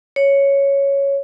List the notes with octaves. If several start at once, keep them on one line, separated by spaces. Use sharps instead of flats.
C#5